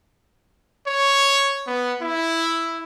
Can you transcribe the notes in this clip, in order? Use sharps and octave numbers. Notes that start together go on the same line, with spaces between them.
C#5
B3
E4